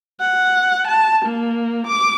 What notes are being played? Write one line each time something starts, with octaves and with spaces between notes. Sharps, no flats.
F#5
A5
A#3
D6